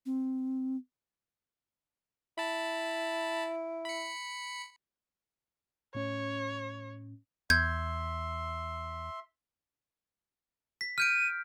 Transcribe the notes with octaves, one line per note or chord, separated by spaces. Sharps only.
C4
E4 A5 B5
B5 C#7
A2 C#4 C#5
E2 E5 C6 G6 G#6
B6
F6 G6 D7 D#7